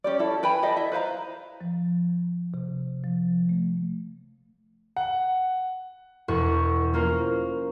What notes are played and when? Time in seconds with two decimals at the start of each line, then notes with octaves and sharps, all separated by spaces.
0.04 C#4 G4 D5
0.19 E4 A4
0.43 B4 G5 G#5 B5
0.62 G4 A4 D5 D#5
0.77 E4 E5
0.92 B4 C5 F5 A#5
1.61 F3
2.54 C3
3.04 F3
3.49 A3
4.96 F#5
6.28 E1 E2 F#5 C#6
6.94 A#3 C#4 F4 A#4 C5